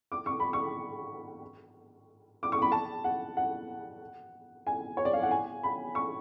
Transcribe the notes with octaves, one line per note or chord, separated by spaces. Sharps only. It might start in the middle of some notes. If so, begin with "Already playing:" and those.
D6
C#6
B5
C#6
D6
C#6
B5
A5
F#5
F#5
G#5
C#5
D5
F5
F#5
G#5
B5
C#6